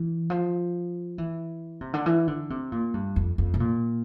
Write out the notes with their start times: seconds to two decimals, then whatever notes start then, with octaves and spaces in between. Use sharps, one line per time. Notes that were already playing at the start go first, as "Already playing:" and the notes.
Already playing: E3
0.30 F3
1.18 E3
1.81 C3
1.94 D3
2.06 E3
2.28 D3
2.50 C3
2.72 A#2
2.94 G2
3.16 F2
3.38 F2
3.54 C3
3.60 A#2